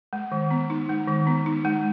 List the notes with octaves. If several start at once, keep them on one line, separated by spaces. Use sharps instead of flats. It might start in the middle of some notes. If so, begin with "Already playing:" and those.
G#3
D#3
B3
D#4
G#3
D#3
B3
D#4
G#3